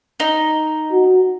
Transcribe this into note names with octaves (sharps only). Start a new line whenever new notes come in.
D#4
F#4